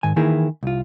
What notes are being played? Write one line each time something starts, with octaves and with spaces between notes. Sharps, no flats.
G#2 D#3 G#5
D#3 E3 A#3 E4 G#4
C2 F4